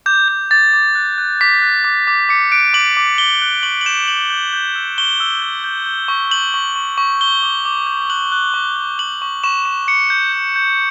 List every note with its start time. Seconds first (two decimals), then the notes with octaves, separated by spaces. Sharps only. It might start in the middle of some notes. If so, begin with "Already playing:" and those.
0.06 D6 G6
0.28 G6
0.51 D6 A6
0.73 D6
0.95 F#6
1.18 F#6
1.41 D6 B6
1.62 F#6
1.84 D6
2.07 D6
2.29 D6 C#7
2.52 F#6 D7
2.74 D6 F#7
2.97 D6
3.18 D6 G7
3.42 F#6
3.63 C#6 F#7
3.81 F#7
3.86 G6 E7
4.08 G6 F#7
4.30 G6
4.53 G6
4.75 E6
4.98 C#6 G7
5.20 E6
5.42 G6
5.64 G6
5.86 G6
6.08 C#6
6.31 G6 F#7
6.54 C#6
6.76 C#6
6.98 C#6
7.21 G6 G7
7.42 D6
7.65 D6
7.87 G6
8.10 F#6 F#7
8.32 F#6
8.54 C#6
8.76 F#6
8.99 G6 F#7
9.22 C#6
9.44 C#6 E7
9.66 C#6
9.88 D6 C#7
10.10 G6
10.32 G6
10.56 G6